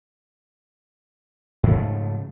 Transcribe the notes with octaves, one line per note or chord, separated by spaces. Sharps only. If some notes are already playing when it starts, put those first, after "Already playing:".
G#2 C#3 F3 A3